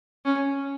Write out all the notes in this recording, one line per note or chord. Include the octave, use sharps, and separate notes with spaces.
C#4